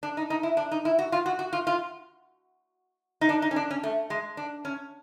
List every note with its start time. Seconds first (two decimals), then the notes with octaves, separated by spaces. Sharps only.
0.03 D4
0.17 D#4
0.30 D#4
0.43 E4
0.57 D4
0.71 D#4
0.85 E4
0.99 F#4
1.12 F4
1.26 F#4
1.39 F#4
1.53 F4
1.67 F4
3.21 D#4
3.29 D4
3.42 D#4
3.51 C#4
3.56 D4
3.71 C#4
3.83 A3
4.10 G#3
4.37 D4
4.65 C#4